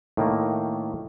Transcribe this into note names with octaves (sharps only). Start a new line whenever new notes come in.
A2 D#3 A#3